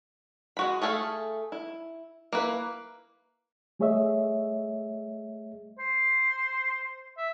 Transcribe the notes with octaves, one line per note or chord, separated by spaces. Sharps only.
G#3 F#4 B5
A3 G#4 A4 C5 F5
E4
A#3 E4 B4
G3 A3 G#4 C#5 D#5 E5
C5
E5